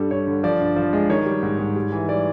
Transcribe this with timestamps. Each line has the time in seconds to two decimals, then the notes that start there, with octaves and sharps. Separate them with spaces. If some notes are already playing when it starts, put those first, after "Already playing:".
Already playing: G2 G3 A4
0.11 G2 C#5
0.27 D3
0.43 F3 D5
0.60 G2
0.76 F3
0.93 G#3
1.10 D#3 C#5
1.26 G3
1.43 G#2
1.59 G#2
1.76 G3
1.92 E3
2.09 G3 D5